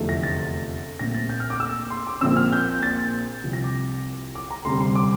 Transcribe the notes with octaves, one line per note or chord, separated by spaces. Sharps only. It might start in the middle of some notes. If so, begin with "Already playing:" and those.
Already playing: F1 E2 D3 F3 A3
A#6
A6
A#1 A#2 A3 C4 A#6
A6
G6
F6
D6
E6
C6
D6
A#1 A#2 F3 C4 E6
F6
G6
A6
C2 C3 F3
A#6
D6
D6
A#5
D2 C3 G3 C4 C6
C6
D6